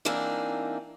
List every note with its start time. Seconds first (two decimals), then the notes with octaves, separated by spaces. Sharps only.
0.05 E3 A#3 C4 D4 D#4